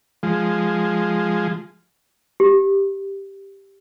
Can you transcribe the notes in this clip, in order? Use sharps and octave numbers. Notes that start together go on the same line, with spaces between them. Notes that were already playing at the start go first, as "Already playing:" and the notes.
F3 G#3
G4